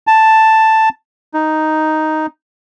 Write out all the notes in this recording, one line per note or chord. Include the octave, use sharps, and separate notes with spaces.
A5
D#4